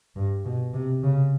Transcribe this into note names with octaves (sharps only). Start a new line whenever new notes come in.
G2
B2
C3
C#3